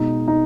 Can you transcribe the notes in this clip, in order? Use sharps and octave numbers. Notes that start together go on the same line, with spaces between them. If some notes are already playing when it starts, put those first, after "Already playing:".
Already playing: B2 G#3 B3 D#4
D#4